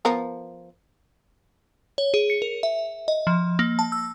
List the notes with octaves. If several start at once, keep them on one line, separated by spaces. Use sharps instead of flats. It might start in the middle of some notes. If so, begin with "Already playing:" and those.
F3 B3 A#4
C#5
G#4
C#7
A#4
E5
D#5
F3
A#3
A5
E6